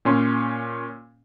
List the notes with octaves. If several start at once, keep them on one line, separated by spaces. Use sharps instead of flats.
A#2 C#4 C6